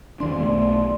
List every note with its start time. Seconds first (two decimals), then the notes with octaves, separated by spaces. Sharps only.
0.20 E2 D#3 D4 D5 C6
0.38 B1 A3 B3